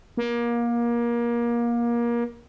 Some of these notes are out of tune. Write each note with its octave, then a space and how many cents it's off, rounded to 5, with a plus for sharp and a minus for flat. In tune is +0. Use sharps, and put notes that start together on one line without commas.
A#3 +25